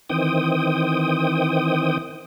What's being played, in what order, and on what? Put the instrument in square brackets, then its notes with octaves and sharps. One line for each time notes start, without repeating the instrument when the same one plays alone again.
[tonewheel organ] D#3 E3 C4 G5 D#6